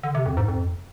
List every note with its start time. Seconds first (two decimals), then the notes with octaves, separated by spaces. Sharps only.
0.03 D3
0.15 C3
0.26 F2
0.37 G#2
0.48 F2